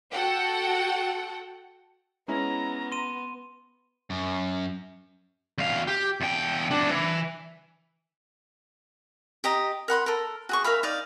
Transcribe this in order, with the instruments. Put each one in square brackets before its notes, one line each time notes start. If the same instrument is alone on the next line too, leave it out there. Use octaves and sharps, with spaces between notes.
[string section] F#4 A4 F#5 G5
[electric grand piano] G#3 C#4 E4 [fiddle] B3 [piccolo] A#5
[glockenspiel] C6 D#7
[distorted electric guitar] F#2
[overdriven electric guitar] E2 F5
G4
E2 G5
E2 D4
E3
[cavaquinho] G4 D#5 A#5
A#4 F#5 B5 C6
A4 A#4
F#4 G#4 C#6
A#4 E5 F5 B5
D#4 D5 F5